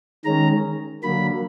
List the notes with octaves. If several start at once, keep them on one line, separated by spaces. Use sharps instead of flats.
D#3 G#3 C#4 A#5
D3 F#3 A#3 B5